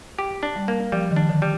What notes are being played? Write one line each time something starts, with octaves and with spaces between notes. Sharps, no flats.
G4
D4
G3
A#3
F3 G3
D#3
D4
D3
G3